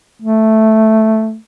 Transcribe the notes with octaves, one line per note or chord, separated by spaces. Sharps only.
A3